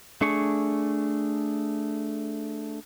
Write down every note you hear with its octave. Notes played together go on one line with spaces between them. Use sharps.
A3 D4 G#4 C#6